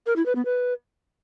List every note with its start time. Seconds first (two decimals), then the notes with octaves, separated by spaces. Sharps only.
0.06 A#4
0.16 E4
0.26 B4
0.36 B3
0.45 B4